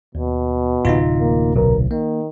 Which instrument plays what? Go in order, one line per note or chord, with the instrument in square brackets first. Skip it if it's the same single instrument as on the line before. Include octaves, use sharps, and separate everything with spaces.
[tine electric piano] D#2 [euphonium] B2
[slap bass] D1 C3 [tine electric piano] D#4 F4
[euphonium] A#3
[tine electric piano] B1 [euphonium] A#4
[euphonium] D#3 [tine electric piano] A#3